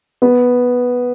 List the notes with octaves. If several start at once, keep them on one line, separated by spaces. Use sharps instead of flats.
B3